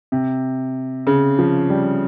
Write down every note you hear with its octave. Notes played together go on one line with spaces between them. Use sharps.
C3
C#3
F3
G3